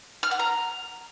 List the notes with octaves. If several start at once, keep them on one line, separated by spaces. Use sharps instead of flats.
F6
F#5
A#5